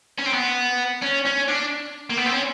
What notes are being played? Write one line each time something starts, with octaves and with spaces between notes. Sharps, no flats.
C#4
C4
B3
C#4
C#4
D4
A#3
B3
C4
C#4